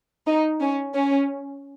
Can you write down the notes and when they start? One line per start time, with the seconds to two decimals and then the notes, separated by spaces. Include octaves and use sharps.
0.27 D#4
0.61 C#4
0.94 C#4